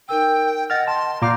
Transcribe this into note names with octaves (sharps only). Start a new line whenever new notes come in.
D#4 A#4 G5 E6
D#5 F#5 F6 A6 A#6
A5 C6
A#2 D5 F5 A#5 D6 G6